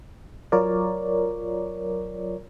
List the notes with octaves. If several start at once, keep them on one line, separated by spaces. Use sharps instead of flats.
F#3 F4 A#4 C#5 D5